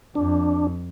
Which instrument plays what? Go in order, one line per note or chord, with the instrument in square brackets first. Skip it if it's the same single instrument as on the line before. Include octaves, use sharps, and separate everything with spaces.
[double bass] F2 [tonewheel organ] D4